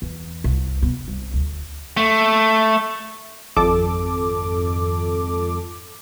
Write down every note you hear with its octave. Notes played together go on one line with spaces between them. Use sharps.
E2
C2
B3
C2
D2
A3
G#1 F2 A4 D6